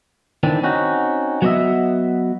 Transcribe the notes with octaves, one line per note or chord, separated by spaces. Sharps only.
D#3 E3 C4 D4
C4 C#4 D#4 F#4
F#3 B3 F#4 C#5 D#5 E5